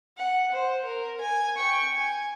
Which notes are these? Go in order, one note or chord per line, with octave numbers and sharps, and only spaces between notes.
F#5
C5
A#4
G#5
G5 C#6
G#5